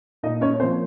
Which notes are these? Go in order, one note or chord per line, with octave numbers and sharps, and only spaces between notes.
A#2 D#4 D#5
C#4 C#5
F3 A#3 C4 C#4 C5